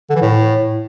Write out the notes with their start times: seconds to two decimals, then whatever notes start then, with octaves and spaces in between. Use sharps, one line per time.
0.10 D3
0.16 E3
0.21 A2